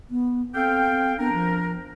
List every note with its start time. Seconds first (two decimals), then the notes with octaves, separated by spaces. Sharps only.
0.10 B3
0.54 C4 A4 F5 G5
1.18 B3 D4 A#4
1.33 F3